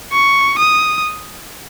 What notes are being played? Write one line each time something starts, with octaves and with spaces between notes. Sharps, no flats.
C#6
D#6